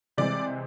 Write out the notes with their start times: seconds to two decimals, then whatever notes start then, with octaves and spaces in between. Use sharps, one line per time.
0.17 C3 E3 G#3 C4 D5